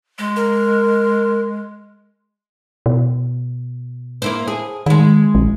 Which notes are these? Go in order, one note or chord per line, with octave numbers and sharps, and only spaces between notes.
G#3
A#4
B2
A#3 E4 C5
G#4
D#3 G#3 E4
A#1